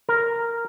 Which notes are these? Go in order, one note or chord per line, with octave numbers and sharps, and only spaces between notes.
A#4